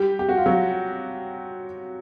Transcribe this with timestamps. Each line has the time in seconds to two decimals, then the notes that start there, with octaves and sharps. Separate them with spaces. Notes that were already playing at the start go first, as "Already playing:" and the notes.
Already playing: G3 G4
0.19 G4
0.29 F#4
0.37 F4
0.46 F#3 F#4